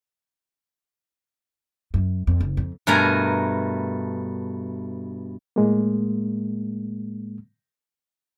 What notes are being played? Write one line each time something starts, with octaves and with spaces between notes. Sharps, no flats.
F#2
F2
F#1
F2
G2 B2 A3 A#4 G#5 A#5
A2 G#3 A#3